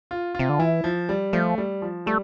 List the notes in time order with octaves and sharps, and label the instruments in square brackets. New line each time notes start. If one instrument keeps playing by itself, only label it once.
[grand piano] F4
[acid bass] C3 [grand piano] F4
[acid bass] D3
[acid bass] E3 [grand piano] E4
[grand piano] F3
G3
[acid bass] F3 [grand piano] A3
[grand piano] G3
F3
[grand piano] G3 [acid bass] A3